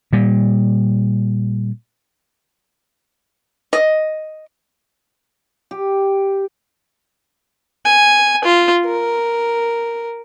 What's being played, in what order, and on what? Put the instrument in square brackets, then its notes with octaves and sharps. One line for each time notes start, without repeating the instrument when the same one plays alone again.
[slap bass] A#2 G3
[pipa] D#5
[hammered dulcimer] G4
[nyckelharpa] G#5
F4
A#4